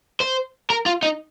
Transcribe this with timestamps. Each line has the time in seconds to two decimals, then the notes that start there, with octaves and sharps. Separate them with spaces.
0.20 C5
0.70 A#4
0.86 F4
1.03 D#4